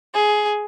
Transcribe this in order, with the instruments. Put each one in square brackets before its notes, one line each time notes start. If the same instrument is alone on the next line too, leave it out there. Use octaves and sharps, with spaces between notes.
[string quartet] G#4